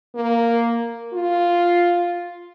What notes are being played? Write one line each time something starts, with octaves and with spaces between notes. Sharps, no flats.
A#3
F4